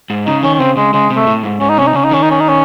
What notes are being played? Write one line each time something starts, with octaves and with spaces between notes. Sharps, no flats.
G#2
C#3 D#4
D#3 C#4
C#4
C#3 C4
C#3 G#3
C#3 G#3
C3
A3
A2
G#2
G#2 C#4
D#4
C3 C#4
D#4
C#3 C#4
D#4
D#3 C#4
D#4
C#4
D#4
C#4